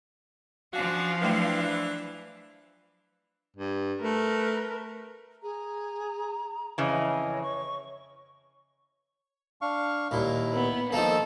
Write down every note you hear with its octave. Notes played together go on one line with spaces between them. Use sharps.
F3 C#4 D4 F#4 F5
E3 F#3 A3 D4 G5
G2
A3 A#4 B4
G#4 A#5
F2 C#3 E3 C#5 D#5
C#6
D4 F5 C#6
D#2 A#2 E4
B3
D#3 F3 A#3 A4